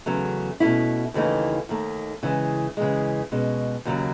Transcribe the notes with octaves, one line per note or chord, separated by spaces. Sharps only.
E2 C#3 F#3 A3 C#4
B2 A3 C#4 E4
D#2 C#3 E3 A3 D#4
D#2 D#3 A3
C#3 E3 G#3
C#3 E3 G#3
B2 G#3 C#4
D#2 C#3 F#3